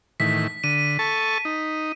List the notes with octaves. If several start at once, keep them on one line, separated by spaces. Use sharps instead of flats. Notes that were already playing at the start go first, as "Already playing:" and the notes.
A2 D#3 E3 B6
D3 D#7
A4 A5 C#6
D#4